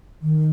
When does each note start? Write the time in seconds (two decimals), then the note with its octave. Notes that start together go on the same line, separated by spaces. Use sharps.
0.22 D#3